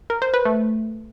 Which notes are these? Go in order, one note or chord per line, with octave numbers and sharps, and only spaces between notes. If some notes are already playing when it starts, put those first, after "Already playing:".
A#4
C5
B4
A3